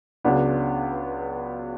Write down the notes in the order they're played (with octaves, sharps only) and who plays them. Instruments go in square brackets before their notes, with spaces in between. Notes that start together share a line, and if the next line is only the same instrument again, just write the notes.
[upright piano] C#2 C#3 F#3 B3 D4